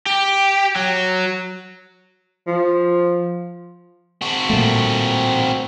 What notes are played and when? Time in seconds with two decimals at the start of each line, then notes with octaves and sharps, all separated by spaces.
0.06 G4
0.76 F#3
2.47 F3
4.21 C4 F#4
4.50 A#2 G3 A3